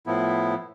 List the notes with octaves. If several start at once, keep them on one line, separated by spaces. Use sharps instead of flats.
A2 F3 B3 E4